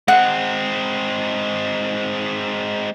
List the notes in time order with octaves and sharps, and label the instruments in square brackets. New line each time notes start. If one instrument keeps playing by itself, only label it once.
[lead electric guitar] G#3 C4 [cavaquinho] F#5